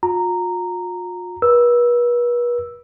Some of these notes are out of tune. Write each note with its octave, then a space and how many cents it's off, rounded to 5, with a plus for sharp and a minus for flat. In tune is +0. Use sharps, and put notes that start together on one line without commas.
F4 +40 A#5 -10
B4 -40 E6 +0